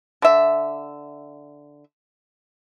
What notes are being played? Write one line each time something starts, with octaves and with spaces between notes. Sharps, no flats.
D3 E5